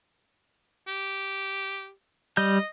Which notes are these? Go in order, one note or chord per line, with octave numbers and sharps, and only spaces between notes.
G4
G3 D#5 G6